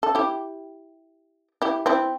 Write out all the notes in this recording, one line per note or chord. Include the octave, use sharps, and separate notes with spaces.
A4
E4 G4
E4 G4
C4 E4